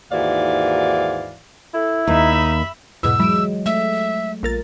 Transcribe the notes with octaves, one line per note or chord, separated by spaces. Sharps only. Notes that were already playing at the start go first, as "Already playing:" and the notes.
D#2 G#2 E3 F#4 D5 F5
E4 A4
D#2 D#4 E5 B5
E2 G#2 B2 E6
E3 F#3 G#3 D7 E7
A3 E5
A#1 A#4 A6